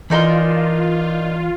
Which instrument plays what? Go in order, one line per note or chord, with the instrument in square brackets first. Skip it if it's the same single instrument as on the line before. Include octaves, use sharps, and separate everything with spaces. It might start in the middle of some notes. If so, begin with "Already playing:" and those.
[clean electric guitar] E3 C6 [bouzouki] D4 D#4 A#4 [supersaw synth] F4